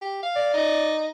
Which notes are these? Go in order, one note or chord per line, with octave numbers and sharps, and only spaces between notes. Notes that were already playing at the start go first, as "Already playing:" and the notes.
G4
F5
D5
D#4